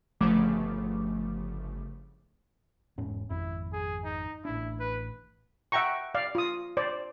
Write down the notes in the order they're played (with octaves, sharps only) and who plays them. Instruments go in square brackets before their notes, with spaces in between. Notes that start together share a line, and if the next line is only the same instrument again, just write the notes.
[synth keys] G1 C#3 F3 A3 D6
[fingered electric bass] E1 G#2 C#4
[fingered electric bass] G#1 F2 [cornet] E4
[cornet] G#4
D#4
[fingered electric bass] A1 D4 [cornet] E4
[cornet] B4
[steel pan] E5 F#5 G5 A#5 C#6
D5 F5
F4 D#6
C5 D5